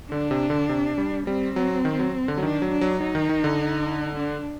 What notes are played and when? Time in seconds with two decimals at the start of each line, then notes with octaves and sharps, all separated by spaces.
0.11 D3 D4
0.31 C3
0.50 D3
0.69 C3
0.98 G3
1.27 G3 C4
1.56 F#3
1.85 D#3
1.99 F#3
2.28 D3
2.37 F#3
2.42 D#3 D4
2.62 F#3
2.72 D4
2.81 F#3
3.01 F#3 D#4
3.15 D#3
3.29 D#3
3.44 D3
4.16 D4